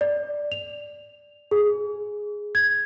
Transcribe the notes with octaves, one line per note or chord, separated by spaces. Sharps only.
D5
F7
G#4
G#6